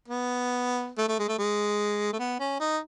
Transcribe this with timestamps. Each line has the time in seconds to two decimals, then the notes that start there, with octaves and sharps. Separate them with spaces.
0.08 B3
0.98 A3
1.08 A3
1.19 G#3
1.28 A3
1.39 G#3
2.13 A3
2.19 B3
2.40 C#4
2.60 D#4